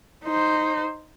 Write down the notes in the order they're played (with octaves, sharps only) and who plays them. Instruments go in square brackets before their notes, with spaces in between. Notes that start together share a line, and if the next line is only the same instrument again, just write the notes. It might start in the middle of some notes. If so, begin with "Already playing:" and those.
[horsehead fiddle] D#4 C5